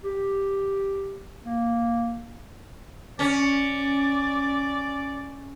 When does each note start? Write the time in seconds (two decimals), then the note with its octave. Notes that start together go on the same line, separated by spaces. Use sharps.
0.04 G4
1.45 A#3
3.19 C#4 D5